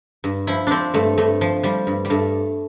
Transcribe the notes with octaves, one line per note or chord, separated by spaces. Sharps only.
G2
F3 E4
F3 C4 D4
G2 A3
G2 A3
F3
F3 G3
G2
G3
G2 A3